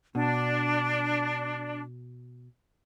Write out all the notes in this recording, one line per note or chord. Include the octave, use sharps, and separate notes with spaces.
B2 D4